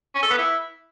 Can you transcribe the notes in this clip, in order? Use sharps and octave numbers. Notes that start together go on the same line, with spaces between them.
C#4
A4
B3
E4